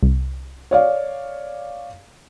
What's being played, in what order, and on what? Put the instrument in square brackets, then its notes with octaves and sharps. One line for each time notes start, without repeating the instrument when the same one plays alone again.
[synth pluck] C2
[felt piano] C#5 D5 F5